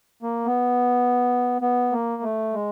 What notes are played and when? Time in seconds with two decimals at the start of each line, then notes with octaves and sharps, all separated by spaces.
0.23 A#3
0.46 B3
1.62 B3
1.92 A#3
2.23 A3
2.54 G#3